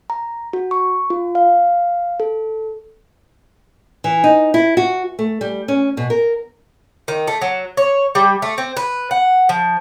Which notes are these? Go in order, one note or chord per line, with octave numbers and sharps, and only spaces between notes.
A#5
F#4
C#6
F4
F5
A4
E3
D#4
E4
F#4
A3
G3
C#4
B2
A#4
D#3
A3
F#3
C#5
G3
A3
C4
B4
F#5
F3